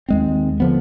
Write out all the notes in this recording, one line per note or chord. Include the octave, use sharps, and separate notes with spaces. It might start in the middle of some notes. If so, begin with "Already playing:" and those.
D#2 G#3 C4
D3 F3 B3